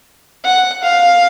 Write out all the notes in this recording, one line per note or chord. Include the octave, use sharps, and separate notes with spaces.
F#5
F5